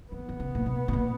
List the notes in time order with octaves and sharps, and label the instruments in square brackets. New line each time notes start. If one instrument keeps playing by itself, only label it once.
[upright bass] D#3 [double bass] B3
[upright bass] D#3
C#3
A#2
B2
B2
A#2